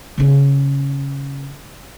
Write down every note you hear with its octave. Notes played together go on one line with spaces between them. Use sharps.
C#3 C#4